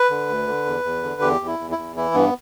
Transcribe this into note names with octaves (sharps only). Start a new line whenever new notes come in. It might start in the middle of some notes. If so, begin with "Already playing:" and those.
Already playing: B4
D3
D2
D3
E2
E2
D3
E2 G4
E2
E4
E2
E4
E2
E3 E4
G2 B3